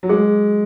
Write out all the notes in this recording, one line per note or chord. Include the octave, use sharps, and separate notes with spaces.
F#3
G#3 G#4